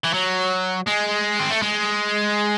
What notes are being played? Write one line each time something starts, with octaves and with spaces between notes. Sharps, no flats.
E3
F#3
G#3
C4
A3
G#3